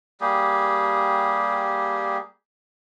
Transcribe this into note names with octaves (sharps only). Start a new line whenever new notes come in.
G3 A#3 G4 G#4